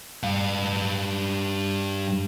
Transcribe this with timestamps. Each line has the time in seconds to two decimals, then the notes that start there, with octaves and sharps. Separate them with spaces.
0.23 G2 F5